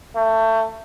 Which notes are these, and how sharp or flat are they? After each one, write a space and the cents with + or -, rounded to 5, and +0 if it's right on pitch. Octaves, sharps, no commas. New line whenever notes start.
A3 +25